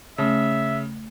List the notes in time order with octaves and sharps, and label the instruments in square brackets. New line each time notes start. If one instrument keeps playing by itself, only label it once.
[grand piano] C#3 [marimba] A3 [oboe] E5